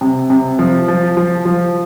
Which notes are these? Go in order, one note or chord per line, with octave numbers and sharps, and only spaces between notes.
C3
C3
F3
F3
F3
F3